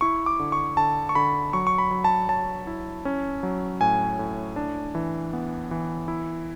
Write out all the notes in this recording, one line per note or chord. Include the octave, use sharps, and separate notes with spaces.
E4 C#6
D6
D3
C#6
D3 A5
C#6
D3 B5
F#3 C#6
C#6
B5
F#3
A5
F#3 A5
E4
C#4
F#3
A2 G#5
A2
D4
E3
B3
E3
E4